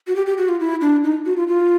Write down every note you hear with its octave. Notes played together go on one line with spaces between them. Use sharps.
F#4
G4
G4
F#4
F4
E4
D4
D#4
F#4
F4
F4